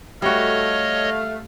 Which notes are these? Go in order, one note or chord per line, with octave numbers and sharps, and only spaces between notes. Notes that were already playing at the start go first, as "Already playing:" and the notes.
G3 A3 F#4 C#5 D#5 F5